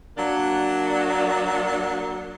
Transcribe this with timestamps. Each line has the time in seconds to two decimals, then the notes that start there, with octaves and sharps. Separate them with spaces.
0.17 F#3 A#3 D4